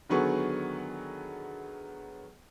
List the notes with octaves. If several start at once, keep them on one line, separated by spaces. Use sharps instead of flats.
D3 D#3 F#3 B3 G#4 C#6